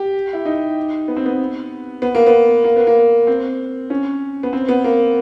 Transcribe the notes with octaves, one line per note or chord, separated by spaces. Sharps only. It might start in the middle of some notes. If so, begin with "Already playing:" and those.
Already playing: G4
E4
D#4
B3
C4
B3
B3
A#3
B3
A#3
B3
A#3
C4
C#4
B3
C4
B3
A#3